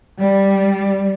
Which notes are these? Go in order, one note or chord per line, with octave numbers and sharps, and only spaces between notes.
G3